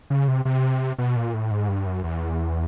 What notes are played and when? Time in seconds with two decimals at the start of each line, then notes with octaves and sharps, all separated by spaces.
0.10 C#3
0.28 C3
0.45 C3
0.98 B2
1.16 A#2
1.34 A2
1.51 G#2
1.68 G2
1.86 F#2
2.04 E2